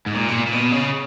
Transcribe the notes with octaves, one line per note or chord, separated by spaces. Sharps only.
G#2
A#2
B2
A#2
A#2
B2
C#3